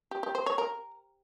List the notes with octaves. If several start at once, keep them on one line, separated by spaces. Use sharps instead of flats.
G4
G4
C5
C#5
A#4